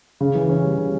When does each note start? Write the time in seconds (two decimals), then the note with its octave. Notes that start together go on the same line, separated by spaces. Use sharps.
0.21 C#3
0.35 E3
0.49 C#4
0.64 G3
0.78 C#3